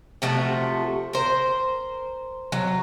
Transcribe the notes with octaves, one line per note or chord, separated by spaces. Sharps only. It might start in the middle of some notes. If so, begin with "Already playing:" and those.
C3 F3 A3 F#4
A#4 C5
F#3